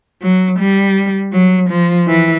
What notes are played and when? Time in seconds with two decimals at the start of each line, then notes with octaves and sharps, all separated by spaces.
0.22 F#3
0.59 G3
1.32 F#3
1.70 F3
2.08 E3